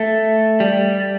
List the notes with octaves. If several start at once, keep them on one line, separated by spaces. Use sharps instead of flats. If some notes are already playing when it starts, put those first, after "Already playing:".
Already playing: A3
G3